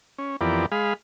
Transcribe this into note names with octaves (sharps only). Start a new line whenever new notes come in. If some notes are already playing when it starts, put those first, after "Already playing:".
C#4
F2 E3 B3 G4 A#4 D5
G#3 G#4 F5 B5